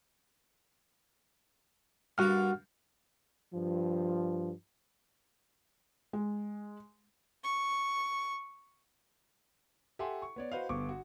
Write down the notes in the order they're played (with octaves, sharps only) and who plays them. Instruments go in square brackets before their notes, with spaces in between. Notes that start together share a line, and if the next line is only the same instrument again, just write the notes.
[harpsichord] G2 A#3 [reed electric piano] F#4 F#5 F6
[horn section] G2 F3
[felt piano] G#3
[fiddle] C#6
[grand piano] G4 A4 E5 F#5 G#5 C6
C#6
B3 C#5 D5
F#4 B4 C5 D#5 F5
G1 B3 C#6 D6
F#4